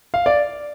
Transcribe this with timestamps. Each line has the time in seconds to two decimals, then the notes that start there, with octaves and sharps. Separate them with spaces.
0.14 F5
0.26 D5